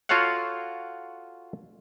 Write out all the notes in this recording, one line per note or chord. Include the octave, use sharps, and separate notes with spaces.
F4 F#4 A4 C#5 F5 F#5